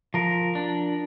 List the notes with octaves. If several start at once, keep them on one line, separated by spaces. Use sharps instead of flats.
F3 A#4
D4